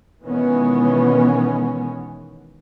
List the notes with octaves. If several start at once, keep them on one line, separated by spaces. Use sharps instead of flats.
B2 D#3 E3 G#3 B3 C#4